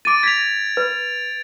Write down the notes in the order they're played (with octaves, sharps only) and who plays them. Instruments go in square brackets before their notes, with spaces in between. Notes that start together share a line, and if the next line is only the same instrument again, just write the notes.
[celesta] D6 D#7 [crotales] A6 D7
[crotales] G#6 F7 [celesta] A#6 B6
[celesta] B4